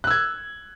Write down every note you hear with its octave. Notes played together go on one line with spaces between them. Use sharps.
E6 F#6 G#6